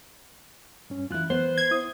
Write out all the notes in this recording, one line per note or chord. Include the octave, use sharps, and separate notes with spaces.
G2 C#4
E3 E4 F4 F#6
B3 C5
G#6
E4 D#6